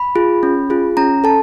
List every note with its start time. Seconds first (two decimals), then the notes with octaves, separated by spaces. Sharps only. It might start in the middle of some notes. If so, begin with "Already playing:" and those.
Already playing: B5
0.15 F4 G#4
0.43 C#4
0.70 F4 G#4
0.97 C#4 A#5
1.24 A4 A5